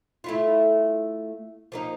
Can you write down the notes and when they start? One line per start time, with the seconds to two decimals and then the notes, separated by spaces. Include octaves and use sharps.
0.24 A3 E4 F4
1.72 F3 A#3 D#4